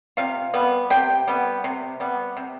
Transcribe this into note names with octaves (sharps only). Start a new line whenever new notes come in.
C3 F4 F5
G3 B3
C3 G4 G5
G3 B3
C3
G3 B3
C3